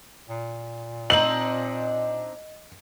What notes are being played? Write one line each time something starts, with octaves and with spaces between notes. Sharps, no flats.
A#2
C4 D4 D#4 D#5 F#7